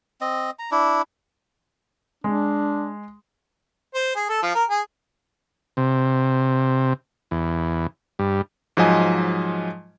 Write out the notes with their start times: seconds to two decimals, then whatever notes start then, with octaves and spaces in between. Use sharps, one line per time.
0.21 C4 D#5
0.59 A#5
0.71 D4 E4
2.24 G#3 D4
3.94 C5
4.16 G#4
4.29 A4
4.42 F3
4.55 A#4
4.70 G#4
5.77 C3
7.31 E2
8.19 G2
8.77 G#2 F3 F#3 D#5 G#5